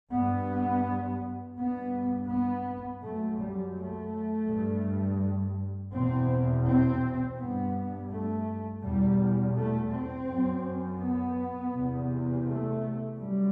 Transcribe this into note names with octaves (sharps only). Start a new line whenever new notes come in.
G2 B3
G2 B3
B3
F#2 A3
G3
A3
G2
E2 B2 C4
C4
G2 B3
A3
E2 B2 G3
A3
C4
F#2
B3
E2 C3
A3
F#2 G3